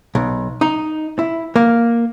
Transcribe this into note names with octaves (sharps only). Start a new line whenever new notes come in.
B1
D#4
E4
A#3